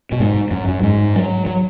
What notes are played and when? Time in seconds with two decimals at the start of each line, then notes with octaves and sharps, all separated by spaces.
0.12 B2
0.20 G#2
0.51 F#2
0.68 F#2
0.83 G#2
1.16 F#3
1.46 F#3